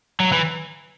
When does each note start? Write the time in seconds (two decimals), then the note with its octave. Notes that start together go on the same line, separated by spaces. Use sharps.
0.20 F#3
0.32 E3